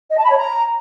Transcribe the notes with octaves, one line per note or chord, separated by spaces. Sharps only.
D#5
A5
B5
C#5
A#5